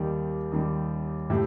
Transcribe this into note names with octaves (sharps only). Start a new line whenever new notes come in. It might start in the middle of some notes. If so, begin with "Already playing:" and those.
Already playing: D#2 D#3 G3
D#2 D#3 G3
A2 A3 G4